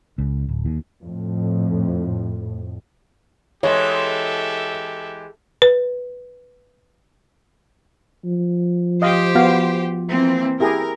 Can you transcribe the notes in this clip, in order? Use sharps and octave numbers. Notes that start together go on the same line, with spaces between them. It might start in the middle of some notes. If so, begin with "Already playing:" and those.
C#2
D1
D#2
F2 A2
E3 G#3 G4 A4 C#5 E5
B4
F3
G4 C5 D#5 F5
B3 F#4 F5
E3 A#3 C4
E4 G4 G#4 A#4